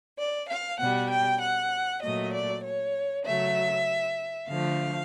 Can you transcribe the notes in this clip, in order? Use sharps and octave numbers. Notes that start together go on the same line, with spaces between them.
D5
F5
B2 G3 F#5
G5
F#5
A#2 F#3 A3 D#5
D5
C#5
C#3 F#3 A3 E5
D3 F3 A3 F5